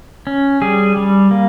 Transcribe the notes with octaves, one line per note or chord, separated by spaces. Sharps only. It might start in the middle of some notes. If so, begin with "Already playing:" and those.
C#4
G3 G#4
G3
A#3